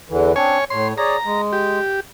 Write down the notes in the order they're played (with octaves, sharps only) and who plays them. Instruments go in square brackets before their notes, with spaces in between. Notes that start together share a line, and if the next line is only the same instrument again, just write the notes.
[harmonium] E2 D3 E3
[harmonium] C4 D4 [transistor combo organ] C#5 G#5
[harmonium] A2 C#5 [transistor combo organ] C6
[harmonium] G#4 C#5 D5 [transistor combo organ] A#5
[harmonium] G#3
[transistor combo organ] G4